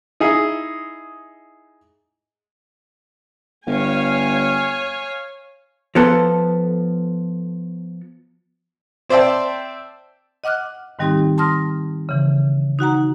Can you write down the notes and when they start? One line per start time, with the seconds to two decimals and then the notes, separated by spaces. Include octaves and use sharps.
0.20 D#4 E4 G#4
3.67 G1 C#5 F5 G#5
5.95 F3 B3 A4
9.09 C4 C5 D5 E5 G5 A5
10.44 D#5 F#5 D6 F6 F#6
10.99 G#2 D#3 G3 C4 D#4 G4
11.38 A5 C6 D#6 F6 A#6
12.09 C#3 E3
12.79 D#4 F#4 F#5 A#5